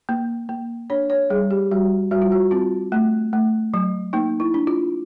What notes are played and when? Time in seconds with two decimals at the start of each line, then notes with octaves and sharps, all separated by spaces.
0.09 A#3
0.49 A#3
0.90 D4 C#5
1.10 C#5
1.30 G3 G#4
1.51 G4
1.71 G3 F#4
2.11 G3 F#4
2.22 F4
2.32 F#4
2.51 C4 F4
2.92 A3
3.33 A3
3.74 F#3
4.13 A#3 D#4
4.40 E4
4.54 D4
4.67 F4